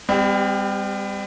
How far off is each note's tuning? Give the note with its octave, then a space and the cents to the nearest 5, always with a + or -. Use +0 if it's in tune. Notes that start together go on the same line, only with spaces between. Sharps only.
G3 +35 C4 -30 G4 +0